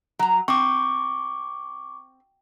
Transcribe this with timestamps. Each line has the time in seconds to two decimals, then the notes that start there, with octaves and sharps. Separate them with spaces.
0.19 F#3 A#5
0.48 C4 C#6 D6